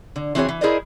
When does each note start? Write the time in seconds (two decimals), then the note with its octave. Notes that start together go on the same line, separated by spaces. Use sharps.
0.16 D3
0.35 E3 C4 F#4 G#4 C#5
0.48 E3
0.61 E4 G#4 A#4 C5 D5 D#5